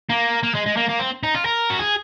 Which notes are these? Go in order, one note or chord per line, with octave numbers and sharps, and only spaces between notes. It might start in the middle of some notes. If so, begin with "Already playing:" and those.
A#3
A#3
G#3
G#3
A#3
A#3
C4
D#4
F4
A#4
F#4
G#4